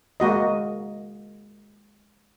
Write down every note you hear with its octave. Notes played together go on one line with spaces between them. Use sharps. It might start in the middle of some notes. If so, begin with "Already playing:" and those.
G#3 A#3 F#4 D#5